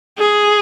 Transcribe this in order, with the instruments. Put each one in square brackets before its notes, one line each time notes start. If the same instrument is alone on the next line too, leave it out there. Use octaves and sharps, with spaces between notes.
[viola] G#4